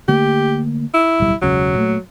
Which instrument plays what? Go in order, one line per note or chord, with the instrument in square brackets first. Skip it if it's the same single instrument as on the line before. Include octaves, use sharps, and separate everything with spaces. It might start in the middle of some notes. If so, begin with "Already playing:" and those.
[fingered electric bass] D3 A3 A#3 [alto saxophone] G4
[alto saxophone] E4
[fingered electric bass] D1 B1 G3
[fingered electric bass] E1 C#2 C#3 [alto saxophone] F#3
[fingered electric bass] A#2 A3